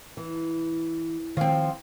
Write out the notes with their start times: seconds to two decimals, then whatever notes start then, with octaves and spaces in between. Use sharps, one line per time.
0.17 E3
1.37 D#3 F3 C4